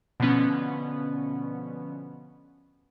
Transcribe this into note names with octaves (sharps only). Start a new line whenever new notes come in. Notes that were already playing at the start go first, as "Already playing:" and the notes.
B2 D3 F3 B3 C#4